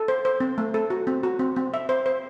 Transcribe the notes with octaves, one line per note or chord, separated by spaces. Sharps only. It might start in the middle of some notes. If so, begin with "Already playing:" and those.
Already playing: A4
C5
C5
C4
A3
A4
F#4
C4
F#4
C4
C4
E5
C5
C5